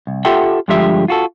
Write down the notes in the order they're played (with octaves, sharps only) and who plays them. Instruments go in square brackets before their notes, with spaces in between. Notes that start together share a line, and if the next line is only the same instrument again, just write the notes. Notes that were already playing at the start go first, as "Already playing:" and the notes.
[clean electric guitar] C2
F4 G4 A4 E5 F#5 G5
G2 D3 F3 G#3 G4 E5
F4 F#4 A4